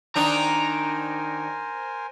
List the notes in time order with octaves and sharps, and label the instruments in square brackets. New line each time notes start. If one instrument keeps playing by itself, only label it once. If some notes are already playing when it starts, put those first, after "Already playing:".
[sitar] D#3 D4 D#4 [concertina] A#4 C5 G#5 [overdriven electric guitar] A#5